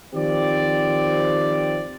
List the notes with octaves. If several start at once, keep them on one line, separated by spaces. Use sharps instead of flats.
D#3 F3 C4 G4 D5